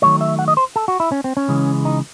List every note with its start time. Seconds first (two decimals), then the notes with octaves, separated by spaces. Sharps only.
0.02 D#3 F#3 A3 C#5
0.21 E5
0.39 F#5
0.48 D#5
0.57 C5
0.76 A4
0.88 F#4
1.00 E4
1.12 C#4
1.24 C4
1.37 C#4
1.48 C#3 E3 G#3
1.85 D#4